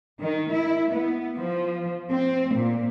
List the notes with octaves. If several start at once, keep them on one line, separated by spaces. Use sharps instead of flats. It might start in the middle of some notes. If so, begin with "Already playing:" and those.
D#3
E4
B3
F3
C4
A#2